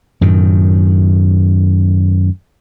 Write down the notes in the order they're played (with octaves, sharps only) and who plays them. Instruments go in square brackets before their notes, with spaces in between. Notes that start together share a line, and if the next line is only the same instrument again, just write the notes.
[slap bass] F#2 A2 D#3